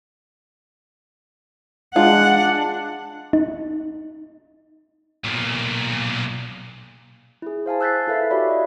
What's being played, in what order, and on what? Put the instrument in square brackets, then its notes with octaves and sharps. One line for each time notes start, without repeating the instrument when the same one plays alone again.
[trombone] G#3 [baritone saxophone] D4 [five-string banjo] F4 [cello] F#5
[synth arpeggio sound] D#4
[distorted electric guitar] B1 A#2
[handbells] E4 G#4
C5 F5 G#5 A5
E6 F#6 G6 A6 B6 C7
E4 A4 B4 E5 F5
F#4 G4 C#5 D5 E5 B5
D#5